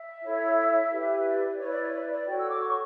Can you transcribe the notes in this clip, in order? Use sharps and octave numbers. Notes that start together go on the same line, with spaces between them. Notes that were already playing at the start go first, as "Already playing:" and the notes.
Already playing: E5
E4 A4 C#5
E4 G4 B4
D5
E4 B4 C#5
D5
C#5
D5
D5
F#4 A4 C#5 G5
E6
D6
C#6